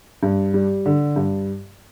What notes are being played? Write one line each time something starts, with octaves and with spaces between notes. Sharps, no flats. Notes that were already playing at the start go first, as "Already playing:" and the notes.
G2
G3
D3
G2